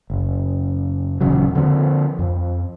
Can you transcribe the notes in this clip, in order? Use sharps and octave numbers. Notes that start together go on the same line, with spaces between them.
F#1
D#1 E2 C#3 F#3
D3 F3 C4
F2